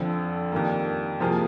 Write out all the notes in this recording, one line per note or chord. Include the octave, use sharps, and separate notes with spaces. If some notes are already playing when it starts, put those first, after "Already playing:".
Already playing: F2 D3 F3
F2 D#3 G3 A#3
C3 F3 A#3 F4 G#4